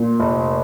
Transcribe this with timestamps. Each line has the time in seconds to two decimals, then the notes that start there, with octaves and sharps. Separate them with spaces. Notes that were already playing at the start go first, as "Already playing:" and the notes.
Already playing: A#2
0.20 F1